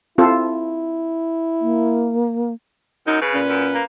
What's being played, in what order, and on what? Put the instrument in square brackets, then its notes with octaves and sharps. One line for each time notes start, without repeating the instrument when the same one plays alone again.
[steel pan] C4 F4 A4 [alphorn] E4
[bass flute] A#3
[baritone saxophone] F#2 [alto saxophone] D#4
[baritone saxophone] C#3 [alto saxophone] B4
[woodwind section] A#2 C#4
[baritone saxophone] F#2
A#3